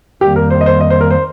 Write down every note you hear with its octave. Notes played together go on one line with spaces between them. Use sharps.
F2 D#3 G3 A#3 G4
A#4
C5
D#5
C5
D#5
C5
A#4
C5